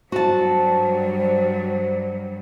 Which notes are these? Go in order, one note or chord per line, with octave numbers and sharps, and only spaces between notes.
G2 F#3 G3 F#4 C5 A5